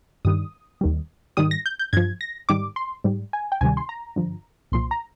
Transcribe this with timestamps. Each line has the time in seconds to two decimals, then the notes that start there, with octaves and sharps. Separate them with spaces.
0.25 G2 D#3 G3 D#6
0.81 D#2 D#3 G3
1.37 G#2 D#3 G3 D#6
1.51 A#6
1.66 G6
1.79 G6
1.93 G2 F3 G#6
2.21 A#6
2.49 G#2 D#3 G3 D6
2.76 C6
3.04 G#2 G3
3.33 G#5
3.52 G5
3.61 D2 C3 D#3 G3 G#5
3.77 C6
3.89 A#5
4.16 G2 D3 F3
4.72 C2 A#2 F3 C6
4.91 A#5